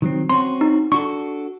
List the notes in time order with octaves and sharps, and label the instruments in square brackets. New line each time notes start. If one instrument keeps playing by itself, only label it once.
[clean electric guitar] D#3 F#3 C4
[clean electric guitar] C4 C#4 F#4 [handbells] C6
[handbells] D#4
[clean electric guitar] D4 F#4 A4 [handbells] C#6